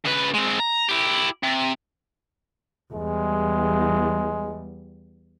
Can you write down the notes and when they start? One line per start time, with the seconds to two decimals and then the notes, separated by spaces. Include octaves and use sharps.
0.05 C#3 B4
0.34 G#3 C4
0.59 A#5
0.89 E4 G4
1.44 C3
2.93 E2 G3 G#3